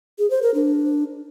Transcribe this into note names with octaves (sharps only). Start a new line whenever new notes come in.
G#4
C5
A#4
D4